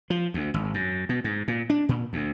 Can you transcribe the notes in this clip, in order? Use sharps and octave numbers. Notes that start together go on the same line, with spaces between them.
F3
D2
G#1
F#2
B2
G#2
A#2
D4
A#2
D2